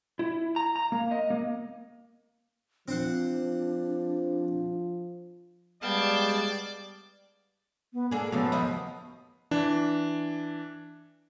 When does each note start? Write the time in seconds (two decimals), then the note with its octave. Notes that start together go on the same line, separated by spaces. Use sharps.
0.19 E4
0.56 A#5
0.76 A#5
0.92 A#3
1.11 D#5
1.30 A#3
2.88 F3 C4 D4 C5 F#5
5.83 G3 G#3 B3 D5 F5 G5 A5 G#6
7.93 B3
8.11 A#3 D4 G#4 A4
8.32 C#3 F3 F#3 A3 B3 A4
8.52 D#2 F3 D#5 B5 D#6
9.51 E3 D4